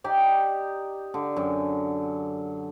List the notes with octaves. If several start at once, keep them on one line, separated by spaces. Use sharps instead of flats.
D#4 G4 D5
D3
F#2